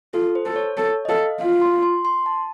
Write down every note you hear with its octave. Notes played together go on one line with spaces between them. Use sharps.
F4 A4
C5
A4
C#5
A4 C#5
D#5
A4 F5
F4 F5
C6
C6
C6
A5